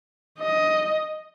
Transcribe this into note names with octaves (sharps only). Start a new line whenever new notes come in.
D#5